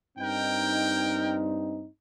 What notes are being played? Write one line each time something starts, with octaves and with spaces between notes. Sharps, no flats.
G2 C4 D#4 A#4 G5